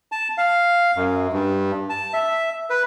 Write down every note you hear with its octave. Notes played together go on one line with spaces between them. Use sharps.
A5
F5
F#2
G2
A5
E5
B4